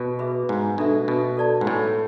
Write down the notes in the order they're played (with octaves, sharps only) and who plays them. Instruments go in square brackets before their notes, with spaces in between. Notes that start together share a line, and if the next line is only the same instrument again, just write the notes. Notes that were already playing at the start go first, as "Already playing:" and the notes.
Already playing: [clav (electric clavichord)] B2
[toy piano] G#4 B4 E5 B5
[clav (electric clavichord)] G#2
[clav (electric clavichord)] B2 [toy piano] D4 A4 E5
[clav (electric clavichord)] B2
[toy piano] A4 D5 A5
[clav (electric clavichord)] G#2
A2